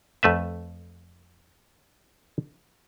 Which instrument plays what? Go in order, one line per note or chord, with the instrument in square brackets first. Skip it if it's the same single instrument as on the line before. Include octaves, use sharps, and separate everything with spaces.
[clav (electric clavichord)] F2 A3 B4 E5